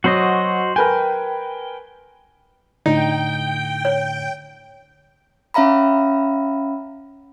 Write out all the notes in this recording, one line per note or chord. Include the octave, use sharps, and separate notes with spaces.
F#3 F#4 C5 D#5
A#4 B4 G5 G#5
A2 D3 D#4 G5
C#5
C#4 E5 F5 A#5 B5